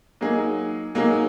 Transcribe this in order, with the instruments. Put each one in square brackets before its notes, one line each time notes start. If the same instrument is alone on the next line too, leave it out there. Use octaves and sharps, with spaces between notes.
[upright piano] F#3 A#3 D#4 G#4
F#3 A#3 D#4 G#4